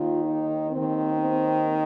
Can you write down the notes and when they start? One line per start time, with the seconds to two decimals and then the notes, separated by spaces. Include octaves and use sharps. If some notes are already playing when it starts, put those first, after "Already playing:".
Already playing: D#2 D#3 F4
0.25 D#4
0.71 D#2 D#3 C4
1.18 C4